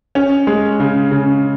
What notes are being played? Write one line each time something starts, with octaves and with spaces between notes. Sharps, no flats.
C#4
G#3
C#3
C#3